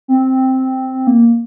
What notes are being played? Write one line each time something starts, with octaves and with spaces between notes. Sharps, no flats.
C4
A#3